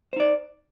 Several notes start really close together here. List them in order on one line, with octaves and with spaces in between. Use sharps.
C5 D#4 D5